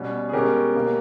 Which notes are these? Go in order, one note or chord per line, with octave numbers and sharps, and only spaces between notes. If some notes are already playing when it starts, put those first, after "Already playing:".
Already playing: B2 G3 C#4
G#4
B2 G#3 C#4 G4 A#4
B2 A#3 C#4